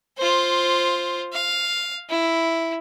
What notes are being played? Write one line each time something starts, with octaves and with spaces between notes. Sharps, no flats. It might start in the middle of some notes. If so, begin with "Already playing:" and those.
F4 C5
F5
E4